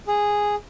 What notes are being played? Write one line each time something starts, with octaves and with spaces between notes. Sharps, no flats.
G#4